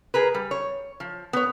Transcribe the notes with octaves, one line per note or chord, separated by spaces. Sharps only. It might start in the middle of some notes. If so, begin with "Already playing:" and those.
G#4 A#4 B4
G3
C#5
F3
B3 C#5